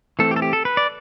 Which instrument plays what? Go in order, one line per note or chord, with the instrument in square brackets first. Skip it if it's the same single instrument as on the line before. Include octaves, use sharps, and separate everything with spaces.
[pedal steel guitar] E3 A3 C4 A4
G4
A4
G4
A4
B4
D5